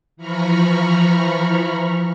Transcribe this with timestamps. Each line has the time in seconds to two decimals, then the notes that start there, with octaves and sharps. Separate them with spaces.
0.17 E3 F3 A#5 B5 C#6 F6